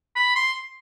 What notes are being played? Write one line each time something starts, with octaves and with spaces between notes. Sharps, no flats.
B5
C6